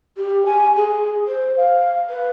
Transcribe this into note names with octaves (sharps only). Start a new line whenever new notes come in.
G4
G#5
G#4
C5
F5
B4